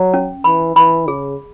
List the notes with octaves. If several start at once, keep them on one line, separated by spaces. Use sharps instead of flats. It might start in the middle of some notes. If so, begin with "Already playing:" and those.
Already playing: F#3
C#4
E3 B5
E3 B5
C#3 G#4